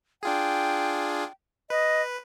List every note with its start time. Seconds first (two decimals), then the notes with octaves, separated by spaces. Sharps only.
0.23 D4 F4 G#4 G5
1.70 B4 D#5